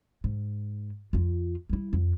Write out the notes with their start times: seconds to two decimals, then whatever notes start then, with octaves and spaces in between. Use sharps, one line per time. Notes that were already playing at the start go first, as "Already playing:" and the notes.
0.24 G#2
1.13 F2 F4
1.69 G3 E4
1.93 F2